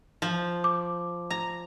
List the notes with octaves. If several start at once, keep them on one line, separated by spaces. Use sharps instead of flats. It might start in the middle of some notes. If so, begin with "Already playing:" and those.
F3
D6
A#5